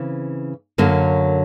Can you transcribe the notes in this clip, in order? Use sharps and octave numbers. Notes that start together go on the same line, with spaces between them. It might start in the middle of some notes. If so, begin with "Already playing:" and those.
Already playing: C#3 E3 C4
F#2 D3 F#3 A#3